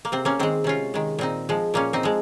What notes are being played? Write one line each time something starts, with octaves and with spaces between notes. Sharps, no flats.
A#3
C3 C4
A#3 C#4
D#3 G#3 C4
C3 C#4 F4
D#3 G#3
A#2 C4 D#4
F3 G#3
A#2 A#3 C#4
C4 D#4
F3 G#3